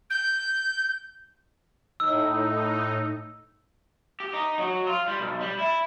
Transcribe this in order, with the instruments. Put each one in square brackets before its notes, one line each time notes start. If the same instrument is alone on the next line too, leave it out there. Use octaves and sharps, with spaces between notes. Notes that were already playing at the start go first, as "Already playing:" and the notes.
[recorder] G6
[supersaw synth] A2 D#4 [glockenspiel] E6
[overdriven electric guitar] G4
D#4
F#3
F4
G3
B1
G3
E4